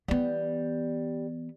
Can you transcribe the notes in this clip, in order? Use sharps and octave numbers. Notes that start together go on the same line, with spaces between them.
E3 G3 B3